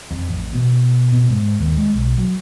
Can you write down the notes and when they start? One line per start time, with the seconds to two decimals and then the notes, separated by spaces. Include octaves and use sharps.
0.11 F2
0.28 A1
0.53 B2
1.12 B2
1.30 G#2
1.59 D#2
1.77 G#3
1.94 B1
2.17 F#3